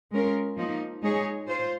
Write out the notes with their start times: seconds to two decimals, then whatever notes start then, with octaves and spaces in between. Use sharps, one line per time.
0.13 G#3 C#4 F4 A#4
0.57 F3 A#3 D#4
1.03 G#3 D#4 G#4 C#5
1.48 F4 C5